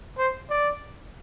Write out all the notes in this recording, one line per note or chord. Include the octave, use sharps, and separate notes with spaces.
C5
D5